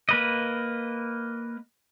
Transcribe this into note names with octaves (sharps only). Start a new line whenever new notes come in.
A#3 B4 D#5